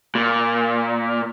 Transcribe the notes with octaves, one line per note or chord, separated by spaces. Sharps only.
A#2